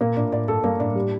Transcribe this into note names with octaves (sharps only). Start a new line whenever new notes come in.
A#2 A#3
A2 D4
A2 D5
G2 A4
G2 A#3
A2 D4
G3